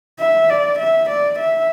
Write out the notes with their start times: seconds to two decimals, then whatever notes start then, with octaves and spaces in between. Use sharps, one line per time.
0.19 E5
0.49 D5
0.79 E5
1.09 D5
1.39 E5